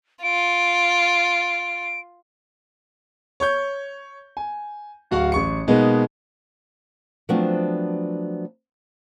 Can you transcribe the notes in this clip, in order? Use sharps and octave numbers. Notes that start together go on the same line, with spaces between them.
F4 D7
C#5 C#6 G6
G#5
D1 F#4 F5 F#5 C#6
A1 C#6 C#7
B2 G#3 A#3 B3 D#4
F3 F#3 A3 B3 C4 D4